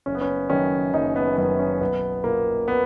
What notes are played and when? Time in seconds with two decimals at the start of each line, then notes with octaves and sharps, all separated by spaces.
0.06 F#1 C#4
0.15 B3
0.21 C#4
0.50 F#2 D#3 C#4
0.94 F#1 D#4
1.16 B3
1.37 F#2 D#3 B3
1.59 C#4
1.81 B1 B3
2.24 A#2 A#3
2.68 B3